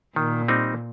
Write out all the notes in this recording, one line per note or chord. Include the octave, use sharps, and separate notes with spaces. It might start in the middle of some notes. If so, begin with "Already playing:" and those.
A#2 D#3
G3 C4 D#4